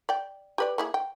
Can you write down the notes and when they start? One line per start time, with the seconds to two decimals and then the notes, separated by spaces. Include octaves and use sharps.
0.09 D5 G5
0.58 G4 B4 D5
0.78 A#3 E4 G#4
0.94 G5